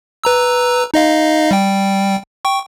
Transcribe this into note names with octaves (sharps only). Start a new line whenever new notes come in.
B4 A#5 E6
D#4 D#5 F5
G3 G5
G5 C#6